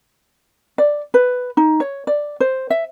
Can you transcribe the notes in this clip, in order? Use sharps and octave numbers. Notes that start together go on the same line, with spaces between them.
D5
B4
D#4
C#5
D5
C5
E5